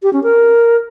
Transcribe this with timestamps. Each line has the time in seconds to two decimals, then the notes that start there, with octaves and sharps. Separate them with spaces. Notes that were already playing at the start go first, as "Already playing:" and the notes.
0.03 G4
0.13 C#4
0.23 A#4